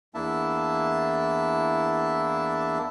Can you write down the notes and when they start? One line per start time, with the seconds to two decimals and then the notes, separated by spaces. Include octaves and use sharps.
0.14 E2 A#3 D4 E4 E5 A5